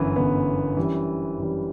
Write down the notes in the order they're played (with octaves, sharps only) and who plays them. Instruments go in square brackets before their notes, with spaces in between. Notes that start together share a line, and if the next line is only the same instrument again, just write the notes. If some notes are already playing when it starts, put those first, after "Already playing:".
Already playing: [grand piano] G1 F#2 E3 B3
G1 F#2 E3 B3
F#2 E3 G3
F#2 E3 G3